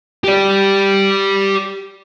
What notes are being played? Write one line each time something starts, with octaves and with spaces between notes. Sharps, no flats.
G4 D5